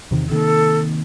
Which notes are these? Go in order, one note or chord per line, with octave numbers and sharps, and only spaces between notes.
E2 C3 D#3
C3 D#3 A#3 A4